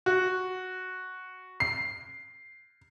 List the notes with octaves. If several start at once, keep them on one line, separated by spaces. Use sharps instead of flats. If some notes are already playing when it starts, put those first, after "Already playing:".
F#4
C7